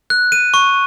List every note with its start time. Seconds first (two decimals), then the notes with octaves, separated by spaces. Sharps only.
0.10 F#6
0.32 D#7
0.54 C#6